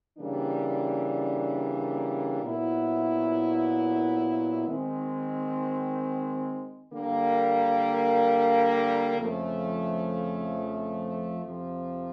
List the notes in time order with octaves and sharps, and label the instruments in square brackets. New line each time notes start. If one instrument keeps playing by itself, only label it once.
[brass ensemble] C#3 E3 G3 A#3 D4
A#2 F#3 B3 E4
D#3 G#3 C4
D3 G3 A#3
F2 C#3 F3 A3
F2 C3 F3